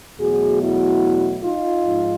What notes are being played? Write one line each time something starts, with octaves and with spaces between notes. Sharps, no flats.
E2 B2 F#3 A3 F#4 G#4
E4 F#4
D#4 F4
G#2 F3